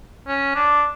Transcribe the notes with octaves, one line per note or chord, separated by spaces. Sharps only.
C#4
D4